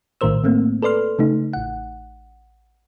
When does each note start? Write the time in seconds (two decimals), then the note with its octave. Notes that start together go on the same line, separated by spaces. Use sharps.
0.21 A#1 A2 D#3 A#4 C5 E6
0.44 A2 A3 A#3 C4
0.83 A4 B4 D5 C6 F6
1.19 C#3 A3 D#4
1.53 A1 F#5